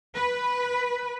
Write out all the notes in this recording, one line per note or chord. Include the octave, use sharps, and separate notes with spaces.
B4